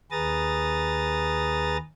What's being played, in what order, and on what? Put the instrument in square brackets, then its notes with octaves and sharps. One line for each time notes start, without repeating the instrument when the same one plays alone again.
[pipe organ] D#2 G#4 B4 A#5 D#6 A6